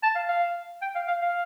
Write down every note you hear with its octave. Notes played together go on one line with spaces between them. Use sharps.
A5
F5
F5
G5
F5
F5
F5